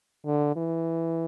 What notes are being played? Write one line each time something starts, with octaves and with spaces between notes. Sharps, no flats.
D3
E3